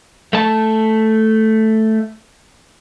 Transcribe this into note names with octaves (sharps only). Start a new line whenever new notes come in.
A3 A5